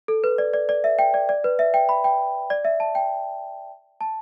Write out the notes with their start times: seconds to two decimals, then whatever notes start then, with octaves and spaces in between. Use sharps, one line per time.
0.08 A4
0.24 B4
0.38 D5
0.54 D5
0.69 D5
0.84 E5
0.99 G5
1.14 D5
1.29 D5
1.44 B4
1.59 E5
1.74 G5
1.89 B5
2.04 G5
2.50 D5
2.65 E5
2.80 A5
2.95 G5
4.01 A5